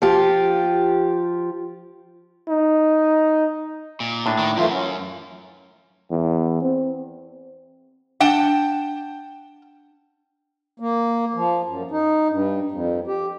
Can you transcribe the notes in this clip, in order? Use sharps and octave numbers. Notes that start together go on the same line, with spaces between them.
F3 F4 G4
D#4
A#2
A2 D4
D#3
F#2 E3 A3 F4
C#4 F#5
E2
C4
D4 F#5 G5 A5
A#3
F3
F#2
D#4
G2
F2
G4